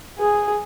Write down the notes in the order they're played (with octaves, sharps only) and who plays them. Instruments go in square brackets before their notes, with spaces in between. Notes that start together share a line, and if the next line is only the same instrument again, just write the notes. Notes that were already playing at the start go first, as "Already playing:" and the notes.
[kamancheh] G#4